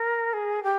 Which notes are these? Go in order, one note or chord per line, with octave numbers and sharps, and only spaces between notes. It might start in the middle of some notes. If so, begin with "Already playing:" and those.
Already playing: A#4
G#4
G4